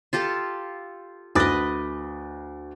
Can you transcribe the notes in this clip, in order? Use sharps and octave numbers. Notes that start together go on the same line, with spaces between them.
F4 G4 A4
D2 B4 D#5 D6 A6